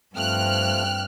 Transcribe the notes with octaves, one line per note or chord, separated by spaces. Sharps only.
G2 F3 A3 C4 G5 F6 F#6